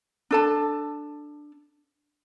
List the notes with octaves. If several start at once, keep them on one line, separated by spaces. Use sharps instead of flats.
D4 A4 A5